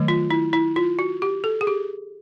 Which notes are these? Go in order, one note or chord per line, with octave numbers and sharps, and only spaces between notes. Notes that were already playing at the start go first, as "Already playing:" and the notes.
Already playing: D#3 F#3 A3
F4
E4
E4
F4
F#4
G4
A4
G#4
G4